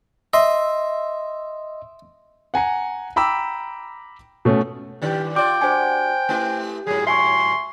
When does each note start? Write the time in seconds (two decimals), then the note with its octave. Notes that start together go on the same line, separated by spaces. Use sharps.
0.33 D#5 E5 C6
2.54 F#5 G#5 A#5 C#7
3.16 G5 A#5 B5 D6 E6
4.45 B2 A3 C#4
5.02 G2 D#3 G4 D5
5.36 F4 D5 G5 D6
5.61 D4 F#4 C5 G#5
6.29 A3 E4 G4
6.87 G#2 F#3 G#4
7.07 E5 G#5 C6 C#6